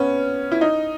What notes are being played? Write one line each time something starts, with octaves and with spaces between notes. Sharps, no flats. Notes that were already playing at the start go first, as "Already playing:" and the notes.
Already playing: B3 C#4
E4
D#4